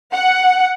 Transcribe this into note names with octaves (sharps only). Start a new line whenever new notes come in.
F#5